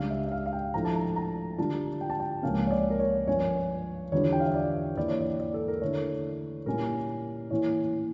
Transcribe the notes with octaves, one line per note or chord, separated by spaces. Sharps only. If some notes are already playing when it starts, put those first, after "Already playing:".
Already playing: C#2 C#3 G3 D4 F5
E5
E5
F5
F5
G5
A2 F3 A3 D4 A#5
A5
A#5
A#5
D3 G3 D4 F4 A5
G5
A5
G5
C#2 C#3 F3 A#3 C#4 F5
C#5
D5
A#4
C#5
G2 F3 C#4 C#5
E2 D3 G3 D4 F4 C#5
G5
F5
E5
D5
E2 E3 A#3 E4 D5
C#5
D5
D5
A4
A#4
D3 A3 E4 C#5
A#2 G3 A#3 C#4 E4 A#4
A2 E3 A#3 C#4 C#5